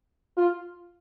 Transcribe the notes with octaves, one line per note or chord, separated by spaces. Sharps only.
F4